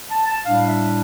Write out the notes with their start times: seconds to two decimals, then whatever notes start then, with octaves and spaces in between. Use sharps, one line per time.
0.10 A5
0.26 A5
0.44 A2 G3 D4 F5
0.67 E5